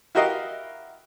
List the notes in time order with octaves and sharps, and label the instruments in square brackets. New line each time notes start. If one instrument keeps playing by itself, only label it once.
[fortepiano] E4 F#4 G4 A#4 D#5 F5